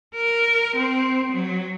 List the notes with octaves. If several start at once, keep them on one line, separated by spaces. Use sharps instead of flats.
A#4
C4
F#3